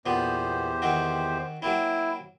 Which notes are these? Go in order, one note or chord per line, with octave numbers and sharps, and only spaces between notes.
E2 A#2 B3 G4 C5
D#3 C4 F#4
F#3 A#3 C4 E4